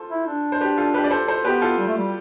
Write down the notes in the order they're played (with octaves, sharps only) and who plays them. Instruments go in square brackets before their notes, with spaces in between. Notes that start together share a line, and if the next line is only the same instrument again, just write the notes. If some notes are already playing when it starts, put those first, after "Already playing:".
Already playing: [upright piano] F4 A4 C5
[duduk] E4
D4
[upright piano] C5
G4 B4
F4 A4
G4 B4
D5
A4 C5
A4 C5
[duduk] B3 [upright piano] G4 B4
[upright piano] F4 A4
[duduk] G3
A3
G3